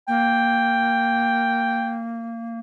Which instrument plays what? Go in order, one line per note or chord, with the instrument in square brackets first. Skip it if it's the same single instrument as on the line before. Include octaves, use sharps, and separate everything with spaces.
[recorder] A#3 [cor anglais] G5